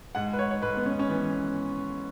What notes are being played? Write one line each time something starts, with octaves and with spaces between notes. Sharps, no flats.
G#2 F#5
B4
C#5
C#5
G#2 B4
B3
C#4
C#4
E3 B3